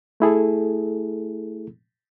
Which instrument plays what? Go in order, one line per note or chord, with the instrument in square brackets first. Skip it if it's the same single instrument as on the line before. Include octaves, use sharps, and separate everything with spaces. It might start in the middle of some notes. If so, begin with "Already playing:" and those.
[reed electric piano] A3 E4 G#4 A4